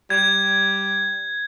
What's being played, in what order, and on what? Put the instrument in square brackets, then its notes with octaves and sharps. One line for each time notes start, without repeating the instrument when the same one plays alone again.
[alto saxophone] G3 [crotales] G#6